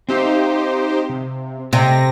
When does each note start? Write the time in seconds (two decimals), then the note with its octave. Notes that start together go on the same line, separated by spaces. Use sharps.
0.09 C4 D#4 G4 C5 E5 F5
1.09 C3
1.73 C3 A4 D#5 G5 A#6